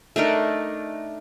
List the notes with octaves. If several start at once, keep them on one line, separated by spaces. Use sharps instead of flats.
A3 D4 D#4 A#4